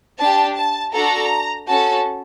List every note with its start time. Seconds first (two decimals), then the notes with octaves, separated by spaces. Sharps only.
0.19 D4 G4 A5
0.57 A5
0.93 D4 F#4 A4 A#5
1.68 C#4 F#4 A4 A5